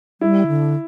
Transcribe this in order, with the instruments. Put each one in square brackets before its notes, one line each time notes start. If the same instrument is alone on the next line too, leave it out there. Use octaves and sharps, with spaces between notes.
[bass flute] G3 [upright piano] E4
[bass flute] D3